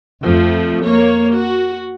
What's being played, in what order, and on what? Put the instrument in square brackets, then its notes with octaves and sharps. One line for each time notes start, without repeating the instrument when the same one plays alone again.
[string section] F2 F3 A3
A#3 C#5
F#4